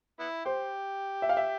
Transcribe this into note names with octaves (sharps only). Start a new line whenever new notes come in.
B3 E4
G4 C5
E5
F5
E5